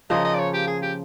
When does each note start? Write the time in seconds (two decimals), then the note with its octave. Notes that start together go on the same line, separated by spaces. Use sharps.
0.10 C#3 F3 A#3 D#5
0.25 D#5
0.34 D5
0.39 C#5
0.54 G4
0.67 G#4
0.82 G4